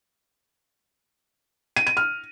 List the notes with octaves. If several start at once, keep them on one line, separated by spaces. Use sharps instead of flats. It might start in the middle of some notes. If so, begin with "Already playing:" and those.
D#7
D#7
F6